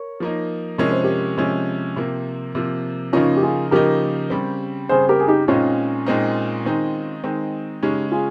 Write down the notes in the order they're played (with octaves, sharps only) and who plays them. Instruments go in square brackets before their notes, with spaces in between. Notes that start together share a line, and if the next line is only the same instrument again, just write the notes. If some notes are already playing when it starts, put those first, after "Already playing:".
Already playing: [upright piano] A#4 C#5
[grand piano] F3 A#3 D#4
[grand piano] C3 F3 G#3 C#4 [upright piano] A#4
[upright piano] C5
G4 A#4
[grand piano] C3 F3 G#3 C#4
C3 F3 A#3
C3 F3 A#3
[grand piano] C#3 F3 A#3 D#4 [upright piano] C#4 F4
[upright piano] G4
F4 G#4
[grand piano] C#3 F3 A#3 D#4 [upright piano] G4 A#4
[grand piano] C#3 G3 C4
[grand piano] C#3 G3 C4 [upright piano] G#4 C5
[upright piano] G4 A#4
G#4
D#4 G4
[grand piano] A#2 G#3 C4 D#4 [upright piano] C#4 F4
[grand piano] A#2 G#3 C4 D#4
D#3 G#3 C4 D#4
D#3 G#3 C4 D#4
[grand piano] C#3 G#3 C#4 [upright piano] D#4 G4
[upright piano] F4 G#4